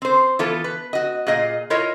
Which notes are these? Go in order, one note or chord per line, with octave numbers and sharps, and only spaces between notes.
C4 C5
E3 B3 F4 A4
B4
F#4 D#5
A#2 G#4 D#5 F5
E4 F4 A#4 C#5 D#5